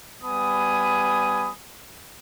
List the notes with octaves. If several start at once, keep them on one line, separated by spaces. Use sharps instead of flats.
G3 B3 G#5 B5 D#6